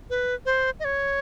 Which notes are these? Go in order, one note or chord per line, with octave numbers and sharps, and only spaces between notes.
B4
C5
D#5
C#5